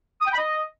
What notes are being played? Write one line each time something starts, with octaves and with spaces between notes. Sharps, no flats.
D#6
G5
B5
D#5